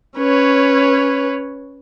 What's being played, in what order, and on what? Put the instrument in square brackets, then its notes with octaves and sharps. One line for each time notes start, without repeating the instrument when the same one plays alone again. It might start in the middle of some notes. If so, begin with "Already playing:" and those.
[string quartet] C#4 B4 C#5